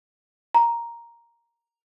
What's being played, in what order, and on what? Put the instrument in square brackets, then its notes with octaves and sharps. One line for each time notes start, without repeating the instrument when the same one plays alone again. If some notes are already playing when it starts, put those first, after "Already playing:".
[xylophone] A#5